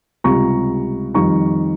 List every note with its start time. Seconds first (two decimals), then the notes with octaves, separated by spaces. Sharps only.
0.24 C#2 C3 G3 A#5 C#6
1.14 F2 D#3 G3 A#5 C#6